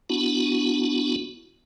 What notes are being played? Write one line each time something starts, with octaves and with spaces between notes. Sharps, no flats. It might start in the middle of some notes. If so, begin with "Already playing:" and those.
B3 D4 E4 F#4